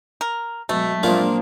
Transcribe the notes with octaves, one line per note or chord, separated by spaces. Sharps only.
A#4
B2 F#3 G#3 A3
A#2 F3 G#3 A#3 C4 D4 F4